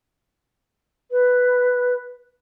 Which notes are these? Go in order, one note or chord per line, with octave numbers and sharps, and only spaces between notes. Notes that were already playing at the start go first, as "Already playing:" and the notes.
B4